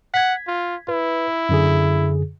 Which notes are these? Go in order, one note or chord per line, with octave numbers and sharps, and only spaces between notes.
F#5 G#6 B6
F4
E4 B4
F#2 D3 G#4